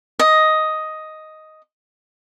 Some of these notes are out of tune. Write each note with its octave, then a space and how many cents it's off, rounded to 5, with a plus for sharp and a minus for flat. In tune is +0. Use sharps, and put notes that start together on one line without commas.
D#5 +5